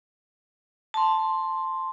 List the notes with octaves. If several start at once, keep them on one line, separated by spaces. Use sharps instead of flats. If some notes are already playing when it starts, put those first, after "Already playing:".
A5 C6